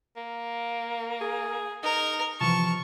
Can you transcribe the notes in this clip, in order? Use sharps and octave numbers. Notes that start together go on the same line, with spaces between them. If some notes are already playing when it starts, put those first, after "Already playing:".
A#3
G#4
D#4 A#4
C3 E3 F3 F4 A5 C#6